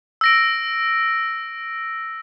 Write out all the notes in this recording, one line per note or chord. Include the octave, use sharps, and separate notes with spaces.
E6 A#6 D7